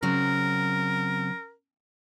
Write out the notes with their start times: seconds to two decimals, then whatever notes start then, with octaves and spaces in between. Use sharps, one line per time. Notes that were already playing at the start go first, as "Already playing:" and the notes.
0.03 C#3 F#3 C4 A#4